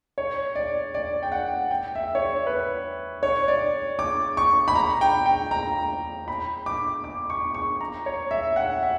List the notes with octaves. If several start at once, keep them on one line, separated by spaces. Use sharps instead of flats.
C#5
D5
D5
G5
F#5
G5
E5
C#5
D5
B4
C#5
D5
D6
C#6
B5
A#5
G5
G5
A#5
B5
D6
D6
C#6
C#6
A#5
C#5
E5
F#5
E5